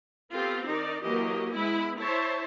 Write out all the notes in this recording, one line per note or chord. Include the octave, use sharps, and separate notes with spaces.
B3 C4 F4 G4 A4
D#3 D#4 A#4 D5
E3 F#3 A#3 G4 A#4 D#5
G#3 B3 E4 E5 B5
E4 C5 C#5 E5 A5